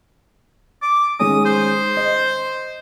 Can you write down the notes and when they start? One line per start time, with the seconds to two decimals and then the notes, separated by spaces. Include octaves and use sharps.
0.82 D6
1.20 D#3 G#3 C#4 D#6
1.45 C5
1.97 D#5